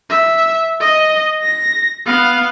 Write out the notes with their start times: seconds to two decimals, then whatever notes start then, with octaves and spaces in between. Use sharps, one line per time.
0.10 E5
0.81 D#5
1.43 A#6
2.06 B3 F5